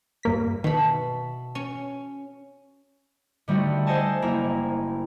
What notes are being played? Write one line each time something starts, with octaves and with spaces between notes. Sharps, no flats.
G2 A#3 B6
B2 D#3 E5 A5 B5
C#4
D3 G3 A3 D#4 F#4
A4 C5 D#5 F#5 G#5 A5
F#1 A#3 E4 A#5